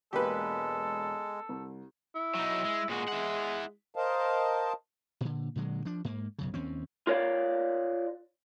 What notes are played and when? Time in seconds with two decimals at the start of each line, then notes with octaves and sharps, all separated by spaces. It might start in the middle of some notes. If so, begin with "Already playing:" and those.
0.13 E1 G#3 A#3 G4 A4 B4
1.49 C2
2.15 E4
2.35 F#3 D#4
2.65 G#3
2.89 A#2 G#3 F#4
3.08 E4 F#5
3.96 A#4 C5 D#5 F5 A5
5.21 A#2 D3
5.56 A#2 D3 F#3 G#3
5.85 F3 D4
6.05 G#2 A#3
6.38 B1 F#2 C#3
6.54 D#2 C4 C#4
7.07 F4 A#4 C#5 D5 F5